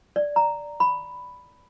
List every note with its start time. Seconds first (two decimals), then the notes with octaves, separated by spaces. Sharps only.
0.16 D5
0.36 A#5
0.80 B5